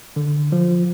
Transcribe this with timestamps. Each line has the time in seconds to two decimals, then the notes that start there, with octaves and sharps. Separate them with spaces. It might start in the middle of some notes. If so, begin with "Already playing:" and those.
0.16 D3
0.52 F3